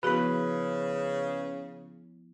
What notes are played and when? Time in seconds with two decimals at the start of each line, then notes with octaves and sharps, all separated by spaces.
0.03 C#3 F3 B3 E4 F#4 G#4 B4 B5